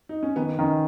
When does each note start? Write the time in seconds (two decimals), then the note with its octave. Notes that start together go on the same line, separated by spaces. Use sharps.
0.09 D#4
0.23 C#4
0.36 D#3 B3
0.59 D#3 C#4